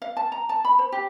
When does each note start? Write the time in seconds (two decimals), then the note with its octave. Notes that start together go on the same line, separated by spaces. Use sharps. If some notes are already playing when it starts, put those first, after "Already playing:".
0.02 F5
0.17 A5
0.32 A#5
0.49 A5
0.65 B5
0.79 C5
0.92 G4